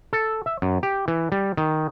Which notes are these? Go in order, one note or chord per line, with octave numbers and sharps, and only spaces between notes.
A4
E5
F#2
G4
E3
G3
D#3